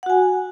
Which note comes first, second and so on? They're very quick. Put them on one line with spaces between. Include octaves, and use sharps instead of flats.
F#5 F#4 G#5